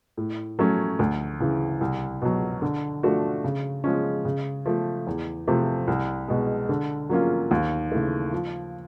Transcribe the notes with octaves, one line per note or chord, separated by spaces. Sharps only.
A2
F#3 A3 C#4
D2
C#3 E3
C2
B2 F#3
D3
F3 A3 D4 F#4
C#3
F3 G#3 C#4
C#3
F3 A3
E2
C3 F3 A3
C2
B2 G#3
D3
F#3 A#3 C#4 F4
D#2
C#3 E3 A3
F3